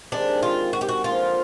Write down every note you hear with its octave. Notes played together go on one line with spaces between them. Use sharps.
C3 D#3 G#3 D4
F4
F#4
G4
F#4
D3 F3 A#3 F4